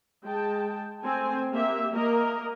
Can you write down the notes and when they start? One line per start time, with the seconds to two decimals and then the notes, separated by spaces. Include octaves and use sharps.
0.24 G#3 G5 A5
1.03 A3 C4 G#5
1.52 A#3 G4 E5
1.93 A#3 A#4 D#5